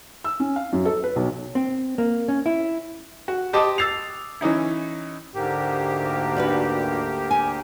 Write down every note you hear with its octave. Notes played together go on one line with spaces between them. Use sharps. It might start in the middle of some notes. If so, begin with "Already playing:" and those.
E6
C#4
F5
F#2
A4
B4
B1
C4
A#3
C#4
E4
F#4
G4 C5 D#5 A5 D6 D#6
E6 A6 C7 F7
E3 C#4 D#4 E4
D2 G#2 A#3 G4
D4 F#4 B4
G#5